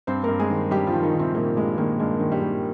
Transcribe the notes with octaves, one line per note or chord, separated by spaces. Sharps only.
G2 C4 C5
G2 A#3 A#4
G#3 G#4
D#3
G2 G3 G4
F3 F4
D#3
D#3 D#4
D#3
C3 C4
A#2 D#3 A#3
G2 G#3
A#2 D#3 A#3
G2 G#3
D#3
G3
D#3